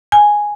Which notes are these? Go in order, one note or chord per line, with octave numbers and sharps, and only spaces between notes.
G#5